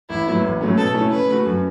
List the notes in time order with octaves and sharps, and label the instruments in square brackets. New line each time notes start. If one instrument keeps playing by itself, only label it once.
[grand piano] A1 [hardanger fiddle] E4
[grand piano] A2 F#3 B3
A1
A2 F#3 A3 C#4
[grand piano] B2 [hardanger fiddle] A4
[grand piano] A3 C#4 E4
[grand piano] C#3 [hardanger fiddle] B4
[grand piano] A3 F#4
F#2